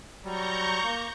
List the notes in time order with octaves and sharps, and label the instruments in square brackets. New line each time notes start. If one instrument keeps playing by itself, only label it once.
[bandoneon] F#3 G3 [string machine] A#5 C#6 G6
[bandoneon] A#3